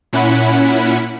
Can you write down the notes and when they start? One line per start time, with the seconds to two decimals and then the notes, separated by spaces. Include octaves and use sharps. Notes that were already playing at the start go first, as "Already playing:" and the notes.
0.13 A#2 C#4 E4 F#5 B5